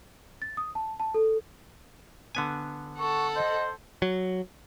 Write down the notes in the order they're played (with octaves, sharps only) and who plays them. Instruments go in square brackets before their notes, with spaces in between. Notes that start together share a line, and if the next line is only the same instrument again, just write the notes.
[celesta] A6
D#6
A5
A5
A4
[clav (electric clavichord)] D3 B3 G#5
[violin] A4 F#5 [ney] C#6
[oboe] C5 [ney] D#5
[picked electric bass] F#3